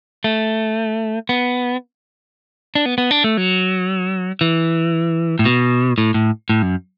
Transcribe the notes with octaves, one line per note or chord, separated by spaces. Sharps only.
A3
B3
D4
B3
B3
D4
A3
F#3
E3
A2
B2
A2
A2
A2
F#2